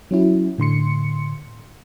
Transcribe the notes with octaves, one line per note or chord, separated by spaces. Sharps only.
F#3 C#4 E4 F#4
A2 D3 C6 C#7